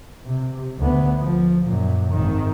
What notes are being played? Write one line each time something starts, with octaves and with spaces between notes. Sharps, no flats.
C3
D2 B3
F3
F#2 A#2
G#1 D#3